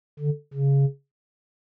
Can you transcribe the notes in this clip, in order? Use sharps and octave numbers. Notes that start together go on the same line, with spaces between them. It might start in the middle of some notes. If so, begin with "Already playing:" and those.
D3
C#3